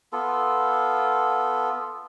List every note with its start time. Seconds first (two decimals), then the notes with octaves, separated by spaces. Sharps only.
0.13 B3 F4 A4